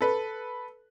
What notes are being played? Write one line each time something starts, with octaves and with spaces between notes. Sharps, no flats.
A4 B4